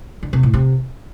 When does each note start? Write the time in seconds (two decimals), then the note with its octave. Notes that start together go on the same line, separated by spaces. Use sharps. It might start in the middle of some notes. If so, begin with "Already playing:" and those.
0.23 D3
0.33 C3
0.43 A2
0.54 C3